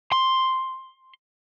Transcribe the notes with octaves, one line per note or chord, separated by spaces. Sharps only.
C6